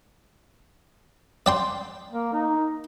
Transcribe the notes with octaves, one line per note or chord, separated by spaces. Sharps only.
D5 G5 C6
A#3
D#4